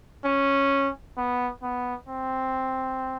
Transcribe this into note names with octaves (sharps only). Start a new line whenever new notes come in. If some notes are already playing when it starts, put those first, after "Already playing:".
C#4
B3
B3
C4